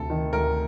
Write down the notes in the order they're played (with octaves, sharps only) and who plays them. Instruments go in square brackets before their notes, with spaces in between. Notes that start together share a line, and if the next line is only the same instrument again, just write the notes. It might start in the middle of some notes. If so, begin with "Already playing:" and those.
Already playing: [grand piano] D2 C3 [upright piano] A4
[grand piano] D#3
[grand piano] D2 [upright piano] A#4